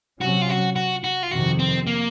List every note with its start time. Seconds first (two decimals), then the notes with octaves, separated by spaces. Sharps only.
0.21 C3 F#3 C#4 F#4
0.42 F4
0.49 F#4
0.76 F#4
1.04 F#4
1.23 F4
1.31 F2 C3 D#3 F#4
1.59 C4
1.87 A#3